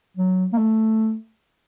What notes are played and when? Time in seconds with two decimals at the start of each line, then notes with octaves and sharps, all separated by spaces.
0.17 F#3
0.53 A#3
0.58 A3